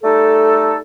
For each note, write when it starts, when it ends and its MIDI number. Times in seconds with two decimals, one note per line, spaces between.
0.03 0.78 55
0.03 0.78 57
0.03 0.78 63
0.03 0.78 69